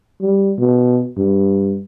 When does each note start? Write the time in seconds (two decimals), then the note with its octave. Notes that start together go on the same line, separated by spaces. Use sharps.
0.21 G3
0.59 B2
1.17 G2